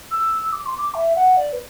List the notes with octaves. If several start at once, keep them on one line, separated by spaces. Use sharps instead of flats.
E6
D6
C6
D6
E5
F#5
D5
B4